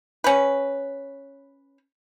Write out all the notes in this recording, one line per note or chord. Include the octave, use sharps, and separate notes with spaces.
C#4 B4